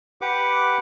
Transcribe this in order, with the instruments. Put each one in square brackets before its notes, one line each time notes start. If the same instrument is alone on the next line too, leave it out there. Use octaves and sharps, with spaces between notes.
[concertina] G4 B4 F#5 D6